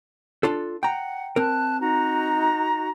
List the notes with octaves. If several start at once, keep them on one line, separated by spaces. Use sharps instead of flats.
D4 F4 A4
F#5 G5 A#5
C4 A#4 A5 F#6
D#4 F#4 A#5